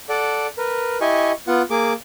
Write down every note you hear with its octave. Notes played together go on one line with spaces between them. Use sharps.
A4 D5 F#5
A#4 B4
E4 G4 D#5 G#5 C#6
B3 F4 F#5
A#3 G#4 D6